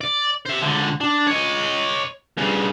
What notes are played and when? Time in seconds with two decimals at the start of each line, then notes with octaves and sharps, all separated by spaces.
0.01 D5
0.46 C5 E5
0.62 C#2 D3
1.01 D4
1.27 C#5 D#5
2.37 G2 C#3